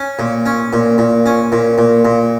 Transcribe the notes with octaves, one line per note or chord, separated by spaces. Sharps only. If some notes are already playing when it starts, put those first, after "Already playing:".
Already playing: C#4
A#2
C#4
A#2
A#2
C#4
A#2
A#2
A#2